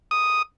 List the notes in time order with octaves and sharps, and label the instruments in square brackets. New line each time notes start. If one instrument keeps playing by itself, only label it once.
[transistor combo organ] D#6